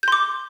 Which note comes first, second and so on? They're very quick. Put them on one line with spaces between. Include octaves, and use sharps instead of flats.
G6 C6 D6